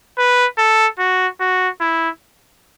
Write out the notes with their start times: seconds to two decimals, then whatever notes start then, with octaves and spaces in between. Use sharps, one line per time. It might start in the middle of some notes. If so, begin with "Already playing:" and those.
0.18 B4
0.58 A4
0.99 F#4
1.40 F#4
1.80 E4